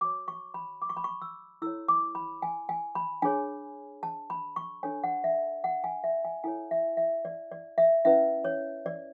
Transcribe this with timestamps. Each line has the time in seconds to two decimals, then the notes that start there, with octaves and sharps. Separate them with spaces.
0.01 F#4 C#5 D6
0.28 C#6
0.54 B5
0.82 D6
0.89 C#6
0.97 B5
1.04 C#6
1.21 E6
1.62 E4 A4 C#5 E6
1.88 D6
2.15 B5
2.42 G#5
2.69 G#5
2.95 B5
3.22 D4 G#4 C#5 G#5
4.03 A5
4.30 B5
4.56 C#6
4.83 D4 A4 C#5 G#5
5.04 F#5
5.24 E5
5.64 F#5
5.84 G#5
6.04 E5
6.25 G#5
6.44 E4 A4 C#5 G#5
6.71 E5
6.97 E5
7.25 D5
7.52 D5
7.78 E5
8.05 C#4 E4 B4 E5
8.44 C#5
8.86 D5